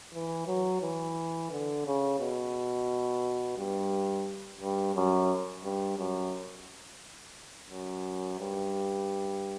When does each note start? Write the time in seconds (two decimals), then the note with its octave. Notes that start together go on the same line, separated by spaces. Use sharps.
0.14 E3
0.47 F#3
0.82 E3
1.51 D3
1.86 C#3
2.20 B2
3.58 G2
4.61 G2
4.95 F#2
5.64 G2
5.98 F#2
7.70 F#2
8.39 G2